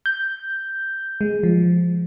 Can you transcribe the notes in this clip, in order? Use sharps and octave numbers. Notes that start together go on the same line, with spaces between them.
G6
G#3
F3